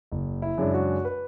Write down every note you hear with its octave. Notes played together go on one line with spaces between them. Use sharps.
F#1
E4
F#2 C#3 G#3 D4
F#4
B4